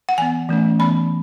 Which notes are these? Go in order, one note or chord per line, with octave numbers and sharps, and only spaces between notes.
F#5
E3 B3 G#5
E3 A3 C#4
E3 B3 B5